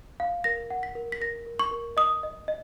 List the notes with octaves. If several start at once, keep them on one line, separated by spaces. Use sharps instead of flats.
F5
A#4 A#6
F#5
B6
A#4
B6
A#4 A#6
A#4
C#6
A#4
D#5 D#6
D#5
D#5